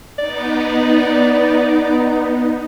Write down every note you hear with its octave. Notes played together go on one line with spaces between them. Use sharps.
B3 D#4 D5